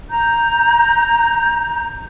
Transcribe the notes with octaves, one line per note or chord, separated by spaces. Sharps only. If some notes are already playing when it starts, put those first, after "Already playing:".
A#5 G6